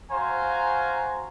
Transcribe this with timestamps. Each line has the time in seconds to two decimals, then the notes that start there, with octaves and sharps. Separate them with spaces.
0.11 F#4 C5 F5 G#5 A#5